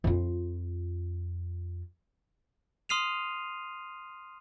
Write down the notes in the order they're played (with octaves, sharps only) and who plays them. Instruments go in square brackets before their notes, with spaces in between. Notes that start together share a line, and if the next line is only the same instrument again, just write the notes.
[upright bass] F2 F4
[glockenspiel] C6 D#6 F6 C7 D#7 F7